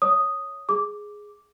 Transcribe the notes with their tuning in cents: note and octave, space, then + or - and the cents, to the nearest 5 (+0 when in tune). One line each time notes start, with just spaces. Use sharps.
C#5 +0 D#6 +0
G#4 +0 D6 +0